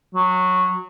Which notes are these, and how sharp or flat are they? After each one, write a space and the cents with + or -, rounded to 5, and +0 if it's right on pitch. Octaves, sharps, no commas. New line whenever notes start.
F#3 -15